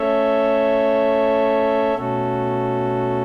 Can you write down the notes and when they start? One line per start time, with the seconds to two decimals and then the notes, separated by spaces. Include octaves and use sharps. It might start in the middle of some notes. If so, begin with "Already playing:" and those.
Already playing: A3 C#4 A4 C#5 E5
1.94 B2 A3 C#4 F#4 A4